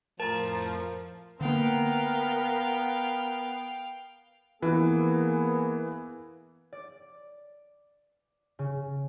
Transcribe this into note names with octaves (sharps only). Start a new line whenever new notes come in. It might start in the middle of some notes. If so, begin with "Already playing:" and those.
F2 A2 F3 A#4 A5 A#5
D3 A#3 B3 A#4 F5 G5
E3 A#3 B3 G#4
D5
C#3